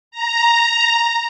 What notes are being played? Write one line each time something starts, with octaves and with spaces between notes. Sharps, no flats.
A#5